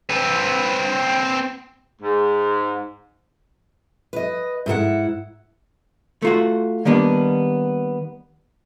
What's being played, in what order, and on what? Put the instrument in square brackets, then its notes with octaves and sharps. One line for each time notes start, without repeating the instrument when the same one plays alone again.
[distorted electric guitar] C4 B4
[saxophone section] G#2
[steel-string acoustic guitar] B4 D#5
G#2 E4 A4 F#5
[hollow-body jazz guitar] A3 F4 F#4
D#3 G3 A#3 B3 D4